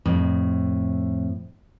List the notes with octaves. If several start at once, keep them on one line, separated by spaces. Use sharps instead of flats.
F2 A2